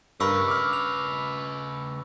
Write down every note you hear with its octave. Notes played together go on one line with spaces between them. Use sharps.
G2 C#3 A#4 B4 B5 C#6 E6
D6 F6
F7